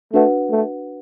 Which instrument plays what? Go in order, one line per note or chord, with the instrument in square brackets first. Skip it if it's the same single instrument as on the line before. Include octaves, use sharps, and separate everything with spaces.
[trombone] A3 [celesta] D4 F#4 B4 F#5
[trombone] A3